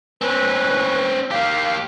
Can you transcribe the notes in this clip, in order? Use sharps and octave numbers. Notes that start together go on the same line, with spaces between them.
C4 C#4 B4
A#3 G4 F5